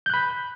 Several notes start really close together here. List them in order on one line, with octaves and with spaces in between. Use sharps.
G6 F#6 B5